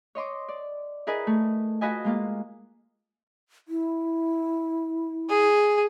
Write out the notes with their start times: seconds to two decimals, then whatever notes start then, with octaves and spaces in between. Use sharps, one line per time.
0.15 C#5 D#5 C6 D6
0.48 D5
1.07 E4 G#4 A#4 B4 D#5
1.27 A3
1.81 F4 F#4 B4 D#5 G#5
2.04 G#3 A#3 F4
3.68 E4
5.30 G#4